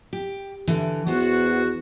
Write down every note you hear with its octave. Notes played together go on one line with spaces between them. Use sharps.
G4
D3 E3
E2 B3 F#4 C5